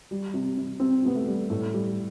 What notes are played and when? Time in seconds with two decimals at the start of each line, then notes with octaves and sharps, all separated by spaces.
0.11 G3
0.34 C3
0.57 C3
0.80 C3 C4
1.03 C3 B3
1.15 A3
1.27 G3
1.50 A2 A3
1.74 G3